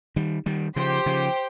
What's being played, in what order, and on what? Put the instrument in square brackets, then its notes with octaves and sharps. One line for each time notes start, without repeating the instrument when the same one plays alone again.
[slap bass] D#3 G3
D#3 G3
[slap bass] C#3 F3 [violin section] G4 C5 G5
[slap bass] C#3 F3